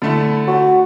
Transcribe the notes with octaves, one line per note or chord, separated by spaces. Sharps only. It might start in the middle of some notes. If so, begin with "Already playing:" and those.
D3 A3 E4
F#4